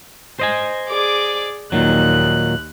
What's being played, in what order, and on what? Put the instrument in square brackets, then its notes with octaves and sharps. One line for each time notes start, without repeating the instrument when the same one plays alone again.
[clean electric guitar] C5 D#5 G#5
[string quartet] G#4 D5 D6
[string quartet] D#2 F#6 [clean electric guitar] A#2 D#3 F#3